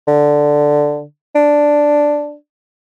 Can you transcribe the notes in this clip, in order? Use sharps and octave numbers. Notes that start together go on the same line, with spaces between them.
D3
D4